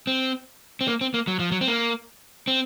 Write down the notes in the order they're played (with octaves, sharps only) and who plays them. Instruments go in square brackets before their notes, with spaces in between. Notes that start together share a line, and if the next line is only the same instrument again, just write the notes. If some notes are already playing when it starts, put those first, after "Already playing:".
[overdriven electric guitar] C4
C4
A#3
C4
A#3
F#3
F3
F#3
C4
A#3
C4